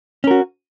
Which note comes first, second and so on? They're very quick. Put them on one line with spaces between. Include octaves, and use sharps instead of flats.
C#4 A#4 F#4